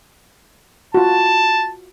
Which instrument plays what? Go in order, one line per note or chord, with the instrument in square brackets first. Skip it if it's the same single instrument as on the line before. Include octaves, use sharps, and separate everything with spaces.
[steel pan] F4 F#4 [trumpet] A5